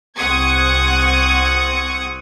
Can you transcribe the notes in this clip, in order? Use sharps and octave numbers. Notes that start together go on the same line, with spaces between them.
C2 C4 F#5 C#6 D#6 G#6